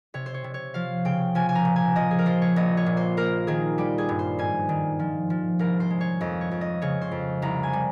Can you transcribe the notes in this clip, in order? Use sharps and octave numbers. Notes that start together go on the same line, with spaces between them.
C3 C#5
C5
C#5
C3
C#5
F3 F5
C#3 G5
F3 G#5
G#5
A#5
A#2
G#5
F3 D#5
G#4
A#4
F3 C5
C#5
A#1 D#5
C#5
A#2
C5
A#3 A#4
D#3 G#4
G3 G4
G#4
G2
C5
G#2 G#5
D#3
F3
F3
C2 A#4
C5
G#3
C#5
F2 D#5
C#5
F2
D#5
C#3 C#5
C5
F2
C2 A#5
G#5
G3